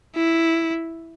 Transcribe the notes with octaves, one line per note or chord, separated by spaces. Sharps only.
E4